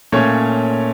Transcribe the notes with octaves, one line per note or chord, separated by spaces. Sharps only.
A#2 A3 C#4 C#5